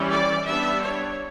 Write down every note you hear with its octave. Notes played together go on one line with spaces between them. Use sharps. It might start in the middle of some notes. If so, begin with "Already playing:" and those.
Already playing: E3 G3 C#4
D5
G3 B3 D4 E5
C#5